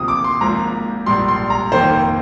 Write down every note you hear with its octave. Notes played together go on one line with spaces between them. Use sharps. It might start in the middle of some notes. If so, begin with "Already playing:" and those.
Already playing: D2 C3 F3 A#3 D#6
D6
C6
G#1 G#2 F3 A#3 A#5
A#1 G#2 G3 C6
C6
A#5
F1 D#2 D#3 A#3 C5